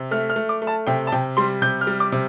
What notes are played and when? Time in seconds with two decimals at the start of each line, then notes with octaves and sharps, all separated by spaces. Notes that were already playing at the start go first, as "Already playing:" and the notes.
Already playing: C3
0.11 A3 F6
0.30 F6
0.36 A3
0.49 D6
0.62 A3
0.67 A5
0.87 C3 G5
1.07 A5
1.12 C3 G5
1.37 G3 C6
1.62 C3 G6
1.81 F6
1.87 G3
2.00 D6
2.12 C3